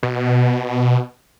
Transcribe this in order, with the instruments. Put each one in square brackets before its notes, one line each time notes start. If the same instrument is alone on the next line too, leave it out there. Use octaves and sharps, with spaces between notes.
[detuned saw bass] B2